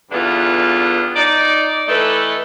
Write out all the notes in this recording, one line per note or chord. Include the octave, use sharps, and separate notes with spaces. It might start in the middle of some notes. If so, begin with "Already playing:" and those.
E2 G2 D3 E3 B3 F4
D#4 D5
E3 A3 D#4 E4 A4 B4